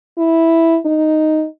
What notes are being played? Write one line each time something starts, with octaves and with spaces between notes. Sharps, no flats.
E4
D#4